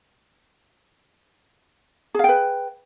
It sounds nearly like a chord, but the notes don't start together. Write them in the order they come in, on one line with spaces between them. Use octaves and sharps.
G#4 F5 G5 B4